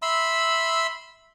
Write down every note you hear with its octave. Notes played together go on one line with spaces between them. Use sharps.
E5 B5 C6 E6